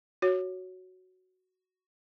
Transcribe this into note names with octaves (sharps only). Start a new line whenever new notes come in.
F#4 C#5